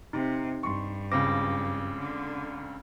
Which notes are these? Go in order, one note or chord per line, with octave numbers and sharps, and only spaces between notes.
C3 D#4
G2 C6 C#6
C#2 C#3 C4 D6 A#6
D3